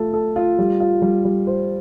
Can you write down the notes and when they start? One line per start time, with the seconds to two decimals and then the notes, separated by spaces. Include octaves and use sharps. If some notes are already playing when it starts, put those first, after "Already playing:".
Already playing: A3 F4 A4
0.13 A4
0.36 F4
0.59 G3
0.80 F4
1.02 G3
1.25 G3
1.47 C5